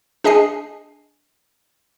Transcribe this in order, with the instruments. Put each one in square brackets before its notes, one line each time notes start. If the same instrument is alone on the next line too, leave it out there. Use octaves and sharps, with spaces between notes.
[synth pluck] D4 G#4 D#5 G#5 C7